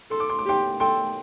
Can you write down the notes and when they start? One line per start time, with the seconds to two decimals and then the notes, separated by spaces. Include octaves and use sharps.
0.11 A4 C6
0.20 D6
0.30 C6
0.39 D6
0.46 G4 G5 C6
0.80 A4 G5 C6